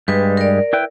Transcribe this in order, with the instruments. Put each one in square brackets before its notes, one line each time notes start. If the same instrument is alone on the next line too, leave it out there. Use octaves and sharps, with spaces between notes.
[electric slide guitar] G2 G3 G#3 [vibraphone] B4
[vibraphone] A#4 D5
[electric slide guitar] E4 B4 G5